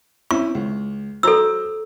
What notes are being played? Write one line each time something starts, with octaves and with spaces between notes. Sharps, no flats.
C4 C#4 E4 C#6
C#2
F#3 A4 C5 A#5 E6